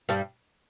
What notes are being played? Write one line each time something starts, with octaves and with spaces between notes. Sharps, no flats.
G2 G3